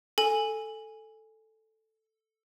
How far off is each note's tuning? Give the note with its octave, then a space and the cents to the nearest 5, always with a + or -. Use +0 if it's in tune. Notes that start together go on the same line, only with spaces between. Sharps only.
A4 +0 G#5 -5